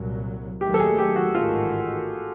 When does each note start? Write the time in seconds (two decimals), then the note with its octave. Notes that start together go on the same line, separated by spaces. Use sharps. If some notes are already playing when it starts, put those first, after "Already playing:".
Already playing: C2 A#2 F#3
0.61 D#2 D#3 F#3 A3 G4
0.74 A4
0.80 G#4
0.98 G4
1.16 F#4
1.35 A1 G#2 D#3 F4